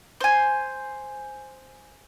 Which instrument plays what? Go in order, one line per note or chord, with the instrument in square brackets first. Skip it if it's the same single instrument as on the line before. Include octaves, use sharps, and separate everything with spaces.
[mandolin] C5 G#5